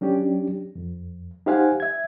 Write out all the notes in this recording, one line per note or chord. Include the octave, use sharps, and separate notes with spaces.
F#3 C#4 D4 G4
F2
D#4 G4 C5 F5 F#5 G#5
E5 G#6